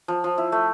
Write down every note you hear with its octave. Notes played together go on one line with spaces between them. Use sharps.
F3
F3
E4
A3